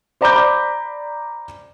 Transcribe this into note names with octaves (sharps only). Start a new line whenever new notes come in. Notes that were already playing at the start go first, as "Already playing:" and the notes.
C5 D5 A#5 B5 D6 G6